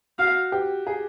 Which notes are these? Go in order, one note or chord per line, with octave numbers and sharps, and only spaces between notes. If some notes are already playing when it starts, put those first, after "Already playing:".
F#4 F5
G4
G#4